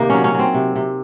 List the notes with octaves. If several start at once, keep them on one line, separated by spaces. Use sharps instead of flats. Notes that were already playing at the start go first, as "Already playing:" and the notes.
Already playing: C3 D#3 A#3 D#4
F#3 C#4
C#4
F#3 C4
C3
C3